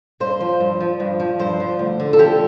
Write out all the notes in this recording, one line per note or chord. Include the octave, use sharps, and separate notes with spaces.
G2 C5
F3
G2
F3
G2
F3
G2 C5
F3
D2
D3
A4
F3 G4